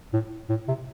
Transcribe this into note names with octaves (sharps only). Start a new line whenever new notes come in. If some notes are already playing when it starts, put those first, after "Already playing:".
A2
A2
C3